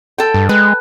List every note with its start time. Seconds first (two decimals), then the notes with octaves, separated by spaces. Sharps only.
0.18 A4 G5
0.34 G2
0.49 G#3 B4